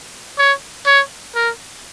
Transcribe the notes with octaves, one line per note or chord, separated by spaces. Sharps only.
C#5
C#5
A#4